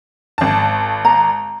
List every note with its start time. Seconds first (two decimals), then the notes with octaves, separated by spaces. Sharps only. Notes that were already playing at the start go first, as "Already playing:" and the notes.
0.38 G#1 A5
1.05 A#5